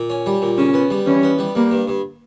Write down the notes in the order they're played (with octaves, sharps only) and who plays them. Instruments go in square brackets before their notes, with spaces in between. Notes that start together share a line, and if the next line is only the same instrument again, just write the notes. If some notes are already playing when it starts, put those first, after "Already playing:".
Already playing: [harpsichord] A#2
C#4
G3
A#2
[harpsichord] C#3 [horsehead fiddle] C#4
[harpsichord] B3
G3
[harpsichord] E2 [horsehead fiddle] C#4
[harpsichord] B3
G3
[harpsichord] G3 [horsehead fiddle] A#3
[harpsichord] G2
G2